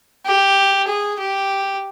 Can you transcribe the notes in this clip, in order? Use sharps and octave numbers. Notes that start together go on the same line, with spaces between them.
G4
G#4
G4